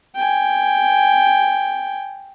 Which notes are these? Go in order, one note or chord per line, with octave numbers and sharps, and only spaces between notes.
G5 G#5